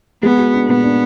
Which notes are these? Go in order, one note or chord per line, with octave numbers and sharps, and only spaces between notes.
G#3 B3
F#4
D4
A#2 B3
D4